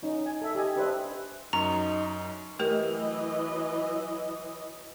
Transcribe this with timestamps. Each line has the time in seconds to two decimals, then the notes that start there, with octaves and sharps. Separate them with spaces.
0.03 C#4 D#4
0.26 G#5
0.42 A4 E5
0.55 G4 D#5 G#5
0.76 D4 G4 B4 C5 D#5 E5
1.53 F#2 D#4 A#5 C#6
2.59 E3 F#3 A3 G4 A#4 D#5